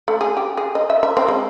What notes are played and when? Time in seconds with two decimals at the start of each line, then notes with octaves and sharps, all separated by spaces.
0.08 A3
0.21 G#4
0.37 G4
0.57 G#4
0.75 D#5
0.90 E5
1.03 E5
1.17 C4
1.28 G#3